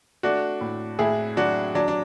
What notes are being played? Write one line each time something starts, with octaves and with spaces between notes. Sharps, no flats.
A3 D4 F#4
A2
A2 E4 G#4
F#3 D4 F#4
F#3 D4
D4